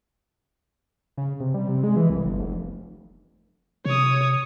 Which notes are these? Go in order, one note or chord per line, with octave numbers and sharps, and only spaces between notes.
C#3
C3
G3
C3
G#3
E3
C2
G1
F1
C3 C#5 D#6